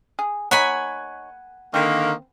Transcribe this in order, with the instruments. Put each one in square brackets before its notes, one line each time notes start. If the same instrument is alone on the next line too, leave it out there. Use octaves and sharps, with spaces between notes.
[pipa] G#4
[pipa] D#4 C#5 [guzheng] F#5 G#5 B5
[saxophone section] D3 D#3 A#3 [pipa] C4